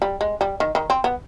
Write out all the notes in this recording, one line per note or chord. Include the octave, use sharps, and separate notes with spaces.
G3
G#3
G3
D#3
D#3
C4
B3